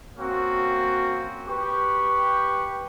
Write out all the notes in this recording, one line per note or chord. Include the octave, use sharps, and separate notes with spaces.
A#3 C4 C#4 F#4
G4 B4 C#6